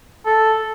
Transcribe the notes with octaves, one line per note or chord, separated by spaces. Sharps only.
A4